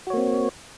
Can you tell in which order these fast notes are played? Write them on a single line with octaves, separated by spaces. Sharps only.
F#4 C#5 A#3 C4